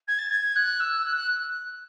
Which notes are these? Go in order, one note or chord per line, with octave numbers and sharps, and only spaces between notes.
G#6
A6
G#6
F#6
E6
F#6
F#6